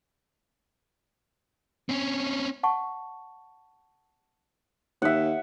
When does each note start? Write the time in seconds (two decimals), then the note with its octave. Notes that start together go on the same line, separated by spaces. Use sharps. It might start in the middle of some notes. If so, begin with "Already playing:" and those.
1.89 C4 C#4
2.63 F#5 A5 C#6
5.02 D#2 E5 F#5